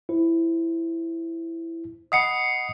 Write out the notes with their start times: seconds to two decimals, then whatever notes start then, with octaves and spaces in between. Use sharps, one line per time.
0.09 E4 C5
2.12 D#5 F#5 B5 D#6 C7 C#7